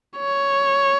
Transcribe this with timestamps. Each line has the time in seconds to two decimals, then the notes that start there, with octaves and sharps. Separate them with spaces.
0.18 C#5